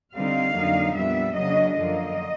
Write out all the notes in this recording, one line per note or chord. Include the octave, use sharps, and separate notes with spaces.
D3 G3 C4 D#4 F5
F2 D3 F#3 A#3 D#4
A#2 G3 B3 D4 E5
C#3 F#3 A#3 D4 D#5
F#2 D3 F3 A#3 D#5